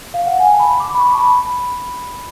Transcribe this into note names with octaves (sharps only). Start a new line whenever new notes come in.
F5
F#5
G#5
A5
B5
D6
B5
C#6
A5
B5